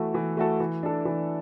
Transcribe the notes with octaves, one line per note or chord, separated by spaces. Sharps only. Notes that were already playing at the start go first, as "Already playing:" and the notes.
Already playing: E3 A3 F#4 A4
E3
A3 F#4 A4
E3
D4 A4
E3